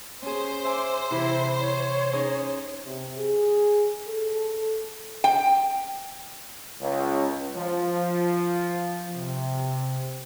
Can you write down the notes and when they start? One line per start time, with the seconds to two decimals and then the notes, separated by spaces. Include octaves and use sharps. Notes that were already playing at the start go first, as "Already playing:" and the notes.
0.22 C#4 G#4 C5
0.65 E5 G#5 D6
1.11 C3 E3 E4
1.60 C#5
2.13 C#4 D#4 G#4
2.85 C3
3.18 G#4
4.07 A4
5.24 G5
6.81 C#2
7.57 F3
9.16 C3